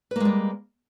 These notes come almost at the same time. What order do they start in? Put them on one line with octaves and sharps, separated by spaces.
B4 A#3 G#3 G3